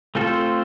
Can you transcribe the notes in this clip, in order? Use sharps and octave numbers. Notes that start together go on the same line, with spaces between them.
A3 C4 F4 A4 C5